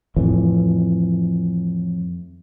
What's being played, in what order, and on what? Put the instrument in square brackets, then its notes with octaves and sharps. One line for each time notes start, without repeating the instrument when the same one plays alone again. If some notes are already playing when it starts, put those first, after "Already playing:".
[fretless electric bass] F2 A2 E3